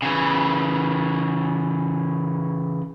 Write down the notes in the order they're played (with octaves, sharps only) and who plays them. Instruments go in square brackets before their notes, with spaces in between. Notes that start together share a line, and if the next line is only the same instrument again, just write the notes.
[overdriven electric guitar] C#3 E3